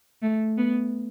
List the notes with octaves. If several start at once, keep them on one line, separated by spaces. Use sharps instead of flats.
A3
B3